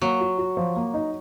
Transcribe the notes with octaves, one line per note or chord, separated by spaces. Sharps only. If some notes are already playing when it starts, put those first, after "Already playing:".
F#3 A#3
F#4
F#4
F3
A#3
D#4